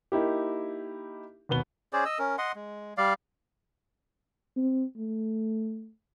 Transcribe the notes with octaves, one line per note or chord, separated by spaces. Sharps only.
A#3 D#4 E4 G4
D#2 B2 B3 G7
C#4 G#4 C5 D5
D#5 E6
C#4 A#4
D#5 F#5 C6
G#3
G3 D5 F5
C4
A3